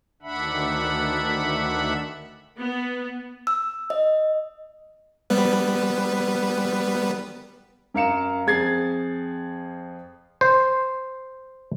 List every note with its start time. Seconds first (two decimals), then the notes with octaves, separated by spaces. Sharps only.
0.22 D2 D#3 D4 E5 F#5 B5
2.56 B3
3.47 E6
3.90 D#5
5.30 G3 B3 B4
7.94 F#2 A#4 F5 C#7 E7
8.47 F2 G#4 G#6 A6 C7
10.41 C5